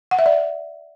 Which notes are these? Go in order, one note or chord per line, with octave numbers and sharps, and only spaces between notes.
F#5
E5
D5